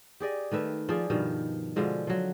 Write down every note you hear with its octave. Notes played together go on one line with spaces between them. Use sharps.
G4 G#4 D5 D#5
D#3 A3 B4 E5
F3 G#4 D5
G2 B2 D#3 F3
B2 D3 F3 G#3
F3 F#3